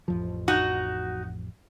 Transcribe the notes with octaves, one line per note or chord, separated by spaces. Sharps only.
A1 F2 F3
D#4 F#4